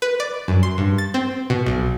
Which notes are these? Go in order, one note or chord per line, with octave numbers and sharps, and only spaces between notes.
B4
D5
F#2
C6
G2
A6
C4
B2
B1